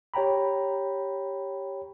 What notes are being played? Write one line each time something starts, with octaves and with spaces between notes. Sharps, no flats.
G4 C#5 G5 A#5 B5